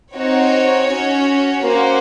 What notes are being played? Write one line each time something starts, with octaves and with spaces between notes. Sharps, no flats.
C4 D#4 F#4 C#5
C#4 F#4
A#3 C#4 F#4 C5